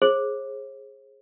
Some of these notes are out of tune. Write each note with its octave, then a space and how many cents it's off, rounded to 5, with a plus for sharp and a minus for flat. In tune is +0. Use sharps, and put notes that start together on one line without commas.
G#4 +0 C5 +45